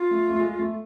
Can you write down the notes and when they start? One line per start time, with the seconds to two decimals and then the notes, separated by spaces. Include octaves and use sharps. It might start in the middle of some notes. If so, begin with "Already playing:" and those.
Already playing: F4
0.11 A3
0.30 A3
0.40 G#3
0.59 A3